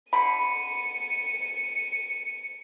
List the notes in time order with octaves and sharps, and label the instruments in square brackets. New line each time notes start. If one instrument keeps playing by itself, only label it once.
[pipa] D3 B5 [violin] C#7 D#7